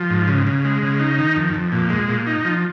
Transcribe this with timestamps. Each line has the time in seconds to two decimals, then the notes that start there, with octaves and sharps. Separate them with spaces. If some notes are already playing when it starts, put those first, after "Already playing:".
Already playing: F3
0.10 G#2
0.28 C#3
0.47 C#3
0.65 G#3
0.82 C#3
1.00 D#4
1.18 D#3
1.36 F2
1.54 F2
1.72 A#2
1.90 G#3
2.09 A#2
2.27 D#4
2.45 F3